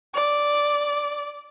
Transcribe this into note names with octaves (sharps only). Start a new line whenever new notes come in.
D5